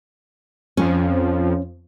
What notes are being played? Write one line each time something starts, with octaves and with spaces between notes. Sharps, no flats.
F2 F3 C#4